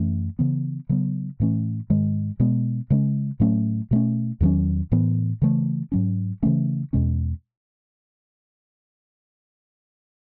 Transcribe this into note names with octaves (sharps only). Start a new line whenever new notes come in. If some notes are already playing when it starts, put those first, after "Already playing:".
Already playing: F#2 E3 A3 C#4
C#3 E3 B3
C#3 F#3 B3
A2 E3 A3 C#4
G#2 D#3 G#3
B2 G#3 B3
C#3 G#3 C#4
A2 F#3 A3 C#4
B2 A3 C#4
E2 D#3 F#3 C#4
A2 E3 B3
C#3 E3 A3
G#2 F#3 C#4
C#3 E3 A3 C#4
E2 B2 G#3 C#4